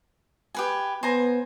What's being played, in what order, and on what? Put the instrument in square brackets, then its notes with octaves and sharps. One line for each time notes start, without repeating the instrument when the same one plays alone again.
[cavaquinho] G4 B4 G#5
[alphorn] B3 [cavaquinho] C5 G#5 A#5